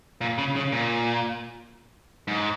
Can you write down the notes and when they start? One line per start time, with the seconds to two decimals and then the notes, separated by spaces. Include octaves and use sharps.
0.21 A#2
0.38 C#3
0.56 C#3
0.72 A#2
2.28 G#2